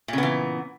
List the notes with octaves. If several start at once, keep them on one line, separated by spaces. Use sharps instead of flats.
A#2 C#3 E3 B3